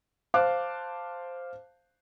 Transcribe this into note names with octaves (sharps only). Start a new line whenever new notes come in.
C5 F5 A5 D6 F#6